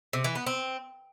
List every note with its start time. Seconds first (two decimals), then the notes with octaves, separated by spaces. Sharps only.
0.13 C3
0.24 E3
0.35 B3
0.46 C4